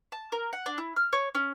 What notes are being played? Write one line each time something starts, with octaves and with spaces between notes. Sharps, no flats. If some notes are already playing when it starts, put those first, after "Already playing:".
A5
A#4
F#5
D4
E4
F6
C#5
C#4